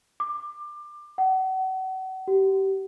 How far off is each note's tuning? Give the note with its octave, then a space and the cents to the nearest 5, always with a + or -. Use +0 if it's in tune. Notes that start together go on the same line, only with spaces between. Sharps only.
D6 +25
F#5 +35
G4 -25